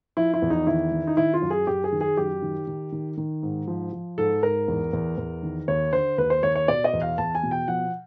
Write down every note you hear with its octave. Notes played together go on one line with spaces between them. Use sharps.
F3 E4
E4
E2
D#4
D#3 E4
D#3
D#4
D#3 E4
F4
F#2
G#4
F#2 G4
G#4
D#3
G#4
F#2 G4
D#3
D#3
D#3
D#3
G#2
F3
F3
G#2 A4
G#2 A#4
E2
E2
E2
D#3
D#2 C#5
D3 C5
D#2 B4
C5
D#2 C#5
C#5
B2 D5
D#5
E2
F5
E2 A5
G#5
B2
G5
F3 F#5